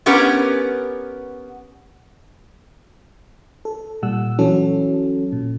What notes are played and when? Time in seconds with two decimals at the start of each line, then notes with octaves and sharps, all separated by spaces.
0.06 B3 C#4 G4 A#4 B4 F#5
3.65 A4
4.02 A#2 G3 F#5 E6
4.39 E3 F#3 C#4 F#4 A4
5.32 A#2